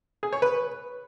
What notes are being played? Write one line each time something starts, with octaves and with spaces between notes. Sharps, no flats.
G#4
C#5
B4